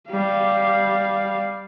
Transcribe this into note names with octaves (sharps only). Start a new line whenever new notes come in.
G3 F5